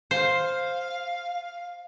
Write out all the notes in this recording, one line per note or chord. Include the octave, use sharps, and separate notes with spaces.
C5 F5